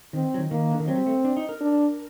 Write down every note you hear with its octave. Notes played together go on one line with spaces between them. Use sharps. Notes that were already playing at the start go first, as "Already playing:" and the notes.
D#3 C4
F#3
D#3
D#3 A#3
D3
D#3
F#3 C4
G3
A3
D4
D#4
A#4
D4